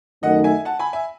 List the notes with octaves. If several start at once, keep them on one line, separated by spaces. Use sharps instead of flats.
F#2 D#3 A3 D#4 D#5 F#5
E5 G#5
F#5 A5
G#5 B5
E5 G#5